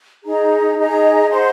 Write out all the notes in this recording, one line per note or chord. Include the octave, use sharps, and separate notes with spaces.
D#4 G#4 D#5 A#5
D#4 G#4 D#5 A#5
C5 F#5 C6